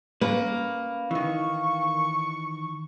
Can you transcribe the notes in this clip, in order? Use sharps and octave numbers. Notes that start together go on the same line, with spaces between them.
A#3 C#4 B4
D#3 E3 C#6